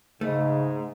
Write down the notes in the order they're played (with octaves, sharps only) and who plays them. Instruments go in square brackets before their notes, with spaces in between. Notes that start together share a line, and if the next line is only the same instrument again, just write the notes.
[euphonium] G#2 [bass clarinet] C#3 [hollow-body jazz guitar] A3 [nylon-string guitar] D#4 A#4 D#5